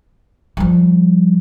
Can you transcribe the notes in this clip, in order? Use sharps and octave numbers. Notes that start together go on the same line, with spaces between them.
F3 G3